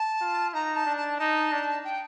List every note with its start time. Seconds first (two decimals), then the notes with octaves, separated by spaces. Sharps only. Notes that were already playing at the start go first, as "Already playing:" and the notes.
Already playing: A5
0.21 F4
0.54 D#4 A#5
0.76 A5
0.86 D4
0.97 A5
1.19 D#4 A5
1.52 D4
1.84 G5